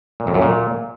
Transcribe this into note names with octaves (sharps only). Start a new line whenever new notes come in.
A#2
F2
F#2
A#2